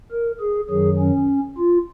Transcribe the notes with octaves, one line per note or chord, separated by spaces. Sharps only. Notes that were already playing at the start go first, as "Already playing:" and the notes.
A#4
G#4
F#2 D#3 F#3 G#4
C#4
F4